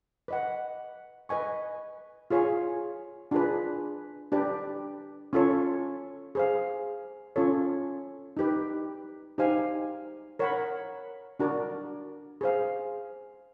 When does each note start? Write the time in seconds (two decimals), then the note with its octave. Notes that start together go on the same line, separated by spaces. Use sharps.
0.28 B4 D#5 F#5
1.29 B4 D#5 G#5 C#6
2.30 F4 G#4 C#5 F5 G#5
3.31 D4 F4 G#4 B4
4.32 D4 G4 B4 D5
5.33 C#4 F4 A4 C#5
6.35 G#4 C5 F5
7.36 C#4 F4 A4 C#5
8.37 D#4 G4 B4
9.38 D#4 G4 C5 F5 G#5
10.39 A#4 C#5 F#5 B5
11.39 D4 F#4 A#4 D5
12.41 G#4 C5 F5